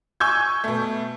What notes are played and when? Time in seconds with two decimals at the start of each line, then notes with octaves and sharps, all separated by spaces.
0.20 G#5 C#6 E6 G6 G#6
0.64 B2 A3